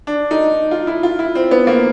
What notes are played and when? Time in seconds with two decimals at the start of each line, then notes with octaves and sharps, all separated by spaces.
0.07 D4
0.31 D#4
0.71 F4
0.87 E4
1.03 F4
1.19 E4
1.35 C4
1.51 B3
1.67 A#3